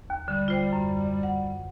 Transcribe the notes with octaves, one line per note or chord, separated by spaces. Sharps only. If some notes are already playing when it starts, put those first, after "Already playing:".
D#2
D3 G3
F4 C5 G5
F#2
F#5